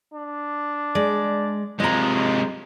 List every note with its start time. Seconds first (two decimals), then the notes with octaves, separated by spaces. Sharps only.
0.13 D4
0.95 G#3 D5
1.80 C3 F3 G#3 D#5 A#5